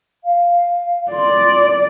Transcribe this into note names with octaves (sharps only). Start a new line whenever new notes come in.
F5
D5 C6